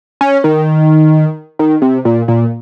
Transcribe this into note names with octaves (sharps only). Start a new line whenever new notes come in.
C#4
D#3
D#3
C3
A#2
A#2